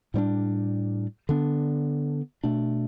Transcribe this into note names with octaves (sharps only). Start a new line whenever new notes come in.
A2 G3 B3 D4
D3 B3 D4
B2 A3 D4